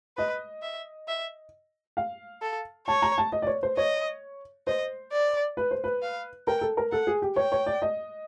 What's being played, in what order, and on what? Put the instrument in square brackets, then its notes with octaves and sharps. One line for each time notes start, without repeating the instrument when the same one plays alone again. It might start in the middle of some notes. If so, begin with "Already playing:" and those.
[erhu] B4 [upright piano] D#5
[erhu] E5
E5
[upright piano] F5
[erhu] A4
[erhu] C#5 [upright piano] A5
[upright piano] A#5
A5
D#5
D5
C#5
C5
[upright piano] C#5 [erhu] D#5
[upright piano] C5 [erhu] D#5
[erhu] D5
[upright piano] B4
C5
B4
[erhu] F5
[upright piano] A#4 [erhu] G5
[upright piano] A4
A#4
[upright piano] A4 [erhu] F#5
[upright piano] G#4
G4
[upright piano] C#5 [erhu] G5
[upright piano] C#5
D5
D#5